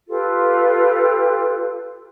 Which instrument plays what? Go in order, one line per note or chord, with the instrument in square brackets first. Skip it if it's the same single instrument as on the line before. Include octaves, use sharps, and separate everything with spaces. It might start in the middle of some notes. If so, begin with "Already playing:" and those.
[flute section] F4 G4 A4 B4